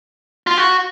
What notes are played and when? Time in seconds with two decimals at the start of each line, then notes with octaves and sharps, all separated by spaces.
0.47 F4
0.58 F#4